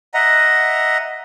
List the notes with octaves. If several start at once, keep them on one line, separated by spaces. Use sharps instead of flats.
D#5 E5 F#5 A#5